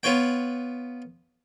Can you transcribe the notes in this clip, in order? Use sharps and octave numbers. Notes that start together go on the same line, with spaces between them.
B3 F4 B4 C#5 G5